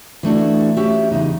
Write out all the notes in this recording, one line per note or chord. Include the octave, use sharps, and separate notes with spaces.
E3 A3 D4 F#4
C#4 F#4 G4 E5
E2 C#3 D#4